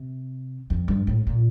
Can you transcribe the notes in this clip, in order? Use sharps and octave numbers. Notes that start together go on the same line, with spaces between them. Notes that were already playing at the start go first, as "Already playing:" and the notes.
Already playing: C3
F2
G2
A2
A#2